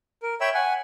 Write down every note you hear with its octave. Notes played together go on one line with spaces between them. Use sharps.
A#4
C#5 E5 G5 B5 E6
F#5 G#5